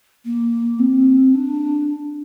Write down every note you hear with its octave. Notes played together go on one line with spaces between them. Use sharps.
A#3
C4
D4